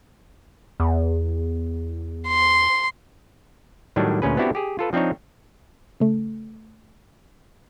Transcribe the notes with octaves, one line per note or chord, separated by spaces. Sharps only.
E2
C6
A2 D#3 F#3 G3 D4
D2 A#2 C#4 G#4 B4
B3 C4 D4 E4 F#4 G4
G4 G#4
F4 A4 B4
F3 C4 D4 D#4 C#5
C#3 A3